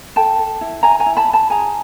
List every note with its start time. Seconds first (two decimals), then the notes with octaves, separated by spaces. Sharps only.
0.16 A4 G5 A5
0.38 A4
0.61 E4
0.83 E4 G#5 A#5
1.00 G#5 A#5
1.06 E4
1.17 A5 B5
1.28 E4
1.33 A5 B5
1.50 G#4 G#5 A#5